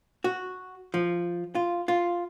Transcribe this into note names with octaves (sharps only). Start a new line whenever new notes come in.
F#4
F3
F4
F4